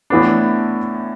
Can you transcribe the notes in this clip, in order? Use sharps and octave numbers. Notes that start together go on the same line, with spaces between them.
A2 E3 B3 D4